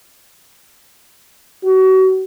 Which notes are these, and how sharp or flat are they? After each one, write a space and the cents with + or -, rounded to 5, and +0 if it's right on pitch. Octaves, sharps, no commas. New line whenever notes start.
F#4 +35